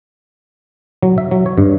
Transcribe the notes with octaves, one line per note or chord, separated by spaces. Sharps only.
F#3
E5
F#3
C#5
G2